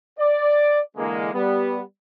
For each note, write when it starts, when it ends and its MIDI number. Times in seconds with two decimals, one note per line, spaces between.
0.19 0.80 74
0.97 1.33 50
0.97 1.33 52
0.97 1.33 56
0.97 1.33 58
1.33 1.80 55
1.33 1.80 59